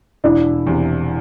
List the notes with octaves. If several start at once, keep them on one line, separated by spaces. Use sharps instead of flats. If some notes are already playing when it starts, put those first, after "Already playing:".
E1 D4 E4
E2 C3